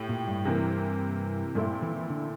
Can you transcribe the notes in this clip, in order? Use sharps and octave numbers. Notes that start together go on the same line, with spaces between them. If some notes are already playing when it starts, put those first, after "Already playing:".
Already playing: A2 G4
A#2
G2
C3 E3 A#3
G2 A#2 A3 C4 E4
E3
E3
D3